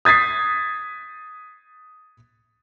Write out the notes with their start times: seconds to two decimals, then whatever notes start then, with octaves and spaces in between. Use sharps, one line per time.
0.05 D#6 G#6 A6 B6 C7